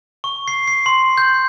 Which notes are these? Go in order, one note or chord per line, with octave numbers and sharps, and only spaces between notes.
C#6
C7
C7
C6
G6